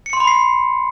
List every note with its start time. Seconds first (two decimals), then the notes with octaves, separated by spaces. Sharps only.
0.06 C#7
0.13 C6
0.20 B5
0.27 C7